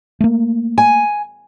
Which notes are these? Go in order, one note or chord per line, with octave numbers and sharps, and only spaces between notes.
A3 A#3
G#5